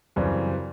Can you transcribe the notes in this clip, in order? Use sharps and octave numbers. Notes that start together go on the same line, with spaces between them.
F#2 C#3 E3 G3 C4